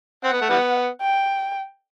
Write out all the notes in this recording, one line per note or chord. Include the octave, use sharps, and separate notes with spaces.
C4 F#5
B3
A3
E3 G3 B3
G5